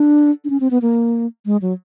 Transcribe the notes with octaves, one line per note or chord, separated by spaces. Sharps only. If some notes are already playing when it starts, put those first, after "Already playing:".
Already playing: D4
D4
C#4
C4
B3
A#3
G#3
F#3